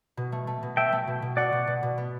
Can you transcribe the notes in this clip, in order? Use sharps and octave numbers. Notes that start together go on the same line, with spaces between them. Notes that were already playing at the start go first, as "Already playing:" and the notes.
B2
A3
A3
B2
A3 E5 G5
A3
B2
B2
F#4 D5 F#5
B2
B2
B2
B3